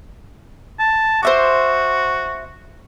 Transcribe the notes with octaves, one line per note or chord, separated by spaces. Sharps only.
A5
F#4 C5 E5 D6